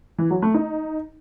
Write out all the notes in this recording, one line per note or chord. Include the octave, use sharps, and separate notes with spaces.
E3
F#3
A3
D#4